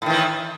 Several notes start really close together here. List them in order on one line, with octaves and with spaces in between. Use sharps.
A2 D#3 E3